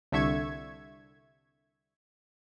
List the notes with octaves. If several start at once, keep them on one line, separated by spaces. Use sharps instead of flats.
C2 D3 E5 C#6 G#6